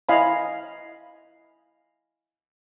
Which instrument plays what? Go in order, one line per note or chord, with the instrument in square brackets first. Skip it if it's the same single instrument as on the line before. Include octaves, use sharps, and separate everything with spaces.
[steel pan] E4 D#5 F5 G#5 B5